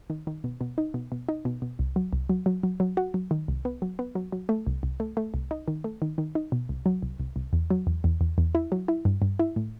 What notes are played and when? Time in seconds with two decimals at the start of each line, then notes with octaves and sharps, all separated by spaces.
0.10 D#3
0.27 D#3
0.44 B2
0.61 B2
0.78 D#4
0.94 B2
1.12 B2
1.29 D#4
1.45 B2
1.62 B2
1.79 C2
1.96 F#3
2.13 C2
2.30 F#3
2.46 F#3
2.63 F#3
2.80 F#3
2.97 F#4
3.14 F#3
3.31 D#3
3.48 C2
3.65 B3
3.82 F#3
3.99 B3
4.15 F#3
4.32 F#3
4.49 A3
4.67 C2
4.83 C2
5.00 A3
5.17 A3
5.34 C2
5.51 D#4
5.68 D#3
5.84 A3
6.02 D#3
6.18 D#3
6.35 D#4
6.52 B2
6.69 C2
6.86 F#3
7.02 C2
7.20 C2
7.36 C2
7.53 E2
7.70 F#3
7.87 E2
8.04 E2
8.21 E2
8.38 E2
8.55 E4
8.72 F#3
8.88 E4
9.05 G2
9.22 G2
9.39 E4
9.56 A2